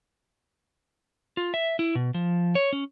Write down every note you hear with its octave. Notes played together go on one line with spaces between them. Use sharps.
F4
E5
E4
B2
F3
C#5
C#4